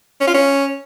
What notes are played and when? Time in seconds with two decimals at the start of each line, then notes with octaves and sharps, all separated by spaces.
0.21 C#4
0.27 F4
0.34 C#4